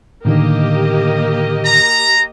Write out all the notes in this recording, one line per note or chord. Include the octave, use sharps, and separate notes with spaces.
A2 D3 D#3 A#3 G4 D#5
A#5